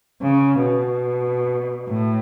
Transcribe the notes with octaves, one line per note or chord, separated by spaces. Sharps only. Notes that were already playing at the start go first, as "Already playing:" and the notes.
C#3
B2
A2